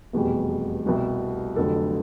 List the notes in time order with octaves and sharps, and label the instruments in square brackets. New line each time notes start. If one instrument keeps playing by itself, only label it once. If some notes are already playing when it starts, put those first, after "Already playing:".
[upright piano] F1 E2 B2 G3
C2 B2 G3
F1 F2 D3 F#3 A4